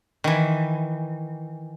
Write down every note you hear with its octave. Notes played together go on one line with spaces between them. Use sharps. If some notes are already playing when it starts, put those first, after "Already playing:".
D#3 E3